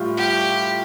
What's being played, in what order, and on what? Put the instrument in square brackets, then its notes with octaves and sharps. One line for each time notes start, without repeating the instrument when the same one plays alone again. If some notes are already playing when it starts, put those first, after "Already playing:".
Already playing: [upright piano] A2 G3 F4
[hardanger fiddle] G4